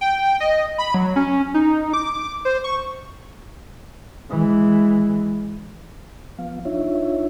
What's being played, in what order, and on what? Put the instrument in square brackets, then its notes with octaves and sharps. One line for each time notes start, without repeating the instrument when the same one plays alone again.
[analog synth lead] G5
D#5
B5
F#3
C#4
D#4
D6
C5
C#6
[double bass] E3 G#3
[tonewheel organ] F3 B3 F5
D4 D#4 F4 C#5 E5